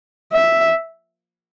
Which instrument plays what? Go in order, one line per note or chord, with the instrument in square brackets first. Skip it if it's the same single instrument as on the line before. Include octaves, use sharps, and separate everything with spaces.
[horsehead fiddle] E5